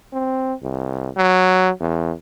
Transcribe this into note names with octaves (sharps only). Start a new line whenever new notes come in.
C4
C2
F#3
E2